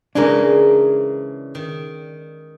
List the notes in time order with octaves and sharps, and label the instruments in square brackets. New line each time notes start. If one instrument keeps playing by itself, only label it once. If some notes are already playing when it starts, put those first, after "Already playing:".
[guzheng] C#3 E3 G#3 [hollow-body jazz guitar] D4 G#4 A#4
[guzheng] D#3